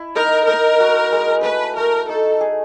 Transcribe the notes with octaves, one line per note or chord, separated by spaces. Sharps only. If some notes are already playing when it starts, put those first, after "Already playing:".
Already playing: E4
D#4 A#4
D#4 A#4
F#4
G#3
A3 B4
A3 A#4
D#4 A4
G#4